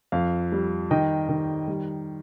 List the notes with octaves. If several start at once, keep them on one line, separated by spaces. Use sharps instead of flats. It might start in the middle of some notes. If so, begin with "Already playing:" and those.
F2 F5
G3
D#3 D#5 G5
D#3
G3